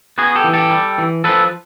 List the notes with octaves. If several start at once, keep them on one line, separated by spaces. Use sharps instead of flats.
B3 F#4 G#4
G4 A4
E3
G4 A4
G3
E3
F3 A4 B4